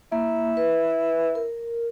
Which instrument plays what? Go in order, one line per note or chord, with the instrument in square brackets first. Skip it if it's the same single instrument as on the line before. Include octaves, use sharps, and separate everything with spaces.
[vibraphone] A#3 [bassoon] E4
[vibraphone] B4
A#4